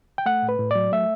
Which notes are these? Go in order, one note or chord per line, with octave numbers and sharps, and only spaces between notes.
G5
A3 F#5
A2
B4
A2
F#3 D5
A3 E5